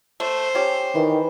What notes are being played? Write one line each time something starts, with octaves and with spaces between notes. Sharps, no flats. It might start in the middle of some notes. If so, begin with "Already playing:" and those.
A3 C5
C#4 G4
D#3 E3